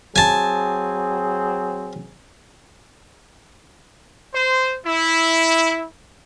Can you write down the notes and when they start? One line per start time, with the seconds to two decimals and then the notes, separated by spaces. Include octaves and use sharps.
0.16 F#3 C4 G#4 G#5 A5
4.34 C5
4.86 E4